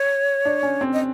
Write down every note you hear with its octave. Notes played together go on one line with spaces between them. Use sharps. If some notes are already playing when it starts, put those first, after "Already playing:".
Already playing: C#5
D4
C#4
C4
D#5